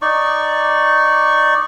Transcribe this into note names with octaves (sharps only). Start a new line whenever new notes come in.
D#4 D5 C#6